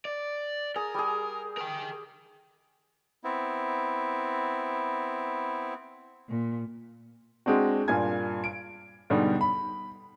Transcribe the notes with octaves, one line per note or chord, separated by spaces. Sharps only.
D5
G#4 A#4
G3 G#4
A#4 G5
B3 C4 E4
A#2
G#3 C4 D4 F#4
G2 A#2 F4 G#5 G#6
D7
G#2 B2 D3 G3
B5